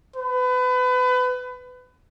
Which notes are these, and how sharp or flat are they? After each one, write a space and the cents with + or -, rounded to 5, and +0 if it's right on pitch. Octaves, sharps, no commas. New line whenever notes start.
B4 +30